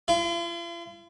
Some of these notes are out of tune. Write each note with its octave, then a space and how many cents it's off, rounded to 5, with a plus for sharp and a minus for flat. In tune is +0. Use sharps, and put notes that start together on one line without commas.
F4 -45